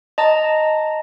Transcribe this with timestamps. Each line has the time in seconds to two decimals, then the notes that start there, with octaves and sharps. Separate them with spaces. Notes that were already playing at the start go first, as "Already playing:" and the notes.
0.18 D#5 A5 A#5